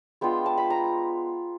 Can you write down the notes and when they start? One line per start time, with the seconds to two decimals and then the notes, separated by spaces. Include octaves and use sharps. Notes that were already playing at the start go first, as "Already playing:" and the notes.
0.21 G#3 B3 D4 F4 G5
0.46 A5
0.58 B5
0.70 A#5